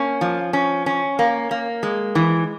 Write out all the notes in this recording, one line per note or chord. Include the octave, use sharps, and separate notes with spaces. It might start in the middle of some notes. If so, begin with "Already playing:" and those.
Already playing: A#3 C#4
F3
C#4
C#4
A#3
A#3
G#3
E3